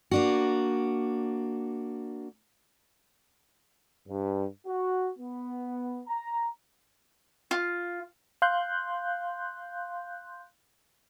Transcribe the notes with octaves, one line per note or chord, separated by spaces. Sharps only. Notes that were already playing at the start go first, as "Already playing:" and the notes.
A#3 D4 F#4
G2
F#4
B3
A#5
F4
F5 C6 F#6 G6